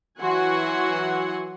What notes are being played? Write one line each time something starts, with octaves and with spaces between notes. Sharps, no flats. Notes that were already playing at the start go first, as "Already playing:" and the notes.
E3 F#3 F#4 F#5 G#5 C6